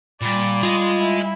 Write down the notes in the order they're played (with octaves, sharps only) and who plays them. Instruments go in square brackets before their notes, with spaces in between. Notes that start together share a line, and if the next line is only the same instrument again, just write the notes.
[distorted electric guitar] A#2 [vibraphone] G3 B5 [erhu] D5
[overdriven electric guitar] F4 [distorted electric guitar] G#4 D#5
[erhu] E4